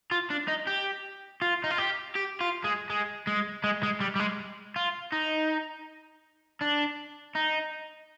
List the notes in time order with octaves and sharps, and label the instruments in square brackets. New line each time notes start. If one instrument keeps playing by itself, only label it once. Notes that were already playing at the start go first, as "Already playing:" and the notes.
[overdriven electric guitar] F4
D4
D#4
G4
F4
D#4
F4
G4
G4
F4
G#3
G#3
G#3
G#3
G#3
G3
G3
G#3
F4
D#4
D4
D#4